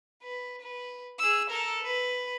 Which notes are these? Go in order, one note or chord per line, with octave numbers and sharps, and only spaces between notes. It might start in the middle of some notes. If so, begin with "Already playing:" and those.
B4
B4
G#4 E6
A4 A#4
B4